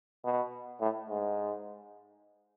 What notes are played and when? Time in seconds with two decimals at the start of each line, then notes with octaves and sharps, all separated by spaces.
0.25 B2
0.80 A2
1.09 G#2